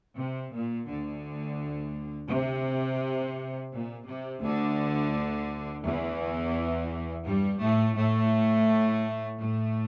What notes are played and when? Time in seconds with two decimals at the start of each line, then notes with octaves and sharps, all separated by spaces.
0.18 C3
0.52 A#2
0.88 D2 D3
2.30 C3
3.71 A#2
4.07 C3
4.42 D2 D3
5.83 E2 E3
7.25 G2 G3
7.60 A2 A3
7.96 A2 A3
9.37 A2 A3